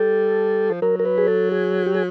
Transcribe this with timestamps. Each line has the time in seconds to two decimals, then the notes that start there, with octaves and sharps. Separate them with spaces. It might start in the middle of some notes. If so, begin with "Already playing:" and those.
Already playing: G3 A4
0.71 F3
0.82 F#3 A#4
0.99 A#4
1.05 B4
1.18 G#4
1.28 A4
1.52 G#4
1.86 G4
1.95 G#4